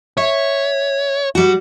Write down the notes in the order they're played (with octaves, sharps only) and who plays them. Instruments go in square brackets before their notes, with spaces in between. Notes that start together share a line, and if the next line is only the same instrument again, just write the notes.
[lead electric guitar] C#5 [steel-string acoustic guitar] E5
[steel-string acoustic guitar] G3 F#4